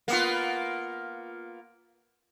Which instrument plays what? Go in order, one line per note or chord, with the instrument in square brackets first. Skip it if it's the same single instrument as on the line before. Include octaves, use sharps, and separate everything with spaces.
[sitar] A#3 B3 F4